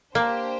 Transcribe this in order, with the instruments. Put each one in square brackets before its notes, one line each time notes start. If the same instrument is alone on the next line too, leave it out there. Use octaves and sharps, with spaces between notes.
[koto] A#3 [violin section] D4 G4 C5 G5